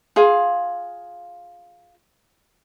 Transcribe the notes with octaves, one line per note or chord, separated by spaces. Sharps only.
F4 G#4 F5